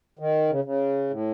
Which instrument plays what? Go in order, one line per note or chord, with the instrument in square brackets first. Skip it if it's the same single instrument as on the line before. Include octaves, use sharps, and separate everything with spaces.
[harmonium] D#3
C#3
C#3
A2